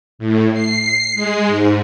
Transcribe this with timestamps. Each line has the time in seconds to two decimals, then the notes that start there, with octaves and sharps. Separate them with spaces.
0.19 A2
0.53 C7
1.15 G#3
1.47 G#2